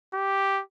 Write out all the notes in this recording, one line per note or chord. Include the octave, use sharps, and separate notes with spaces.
G4